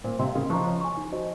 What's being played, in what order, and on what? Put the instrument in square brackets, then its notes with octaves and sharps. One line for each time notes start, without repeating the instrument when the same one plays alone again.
[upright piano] A#2 [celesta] C5
[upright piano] C3 [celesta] C6
[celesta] F5
[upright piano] C#3 [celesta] A#4
[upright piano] F3 [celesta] D#5 A#5 C#6
[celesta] C#5
G#5 C#6
D#4
F#4 C5 D#5